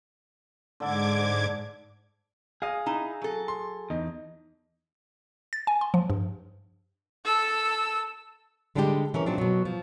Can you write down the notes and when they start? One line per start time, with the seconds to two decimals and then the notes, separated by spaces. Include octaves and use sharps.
0.80 G#2 D3 A4 D6 G#6
2.62 G#4 D#5 F5
2.86 D#4 E4
3.22 F#3 A4
3.48 C6
3.90 E2 D#4
5.53 A6
5.67 G#5
5.81 C6
5.94 F3
6.10 G2
7.25 A4 E6
8.75 D3 G3 G#3 D4 E4 G4
9.14 E3 C#4 A#4
9.26 A#2 F3 F#3 C4 D4 D#4
9.38 B2 F#3
9.65 F3